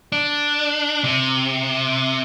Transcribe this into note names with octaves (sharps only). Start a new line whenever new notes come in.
D4
C3